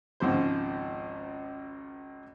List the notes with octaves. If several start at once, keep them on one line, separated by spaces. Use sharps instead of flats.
G#1 C#2 G#2 F3 C5